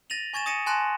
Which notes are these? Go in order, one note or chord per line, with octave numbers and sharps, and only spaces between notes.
A6 A#6 D#7 F7 F#7
G#5 C#6 G#6 A6 E7
D#6 G#6 A#6 C#7 D#7 E7
G#5 A5 C6 F#6 A#6 E7